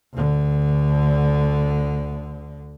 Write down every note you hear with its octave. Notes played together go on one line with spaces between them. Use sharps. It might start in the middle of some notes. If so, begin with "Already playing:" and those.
D2 D3